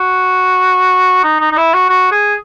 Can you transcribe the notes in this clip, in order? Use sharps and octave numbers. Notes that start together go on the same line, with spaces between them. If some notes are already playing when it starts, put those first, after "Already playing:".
Already playing: F#4
D#4
D#4
D#4
E4
F#4
F#4
G#4